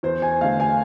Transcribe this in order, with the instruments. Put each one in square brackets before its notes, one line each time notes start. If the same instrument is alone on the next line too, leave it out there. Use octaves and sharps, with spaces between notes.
[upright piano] E2 C5
G#5
D3 A3 F5
G#5